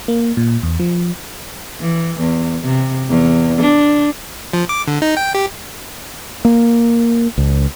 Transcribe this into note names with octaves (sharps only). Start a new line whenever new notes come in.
A#3
A#2
E2
F3
E3
E2
C3
E2
D4
F3
D6
D3
D#4
G5
G4
A#3
C#2